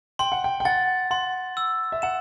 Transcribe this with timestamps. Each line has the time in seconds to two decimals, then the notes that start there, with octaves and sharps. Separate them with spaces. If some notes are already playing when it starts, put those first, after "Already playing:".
0.19 G5 C6
0.32 F#5
0.44 G5
0.60 G5
0.65 F#5 A6
1.11 F#5 C6
1.57 E6
1.92 E5
2.02 F#5 E7